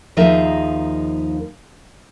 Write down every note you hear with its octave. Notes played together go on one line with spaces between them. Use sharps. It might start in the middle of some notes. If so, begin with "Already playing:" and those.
D#2 F3 D#4 G#4 A#4 E5